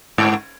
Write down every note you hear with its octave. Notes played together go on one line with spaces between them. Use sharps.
G#2